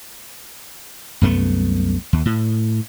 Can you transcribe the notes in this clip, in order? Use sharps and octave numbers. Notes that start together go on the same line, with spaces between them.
C2 F#2 A3 B3
D#2
A2